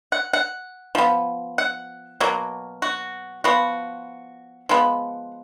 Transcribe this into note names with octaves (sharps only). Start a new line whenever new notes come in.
F#5
F#5
F3 B3
F#5
B2 F#3 A#3
F#4
F3 B3 F#4
F3 G#3 B3